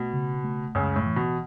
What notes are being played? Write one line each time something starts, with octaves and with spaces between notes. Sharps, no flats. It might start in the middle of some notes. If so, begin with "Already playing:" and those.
Already playing: B2 A3
C#3
A3
C#2 F#2 C#3
A2
E3
B2